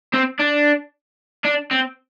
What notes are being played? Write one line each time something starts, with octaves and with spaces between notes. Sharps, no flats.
C4
D4
D4
C4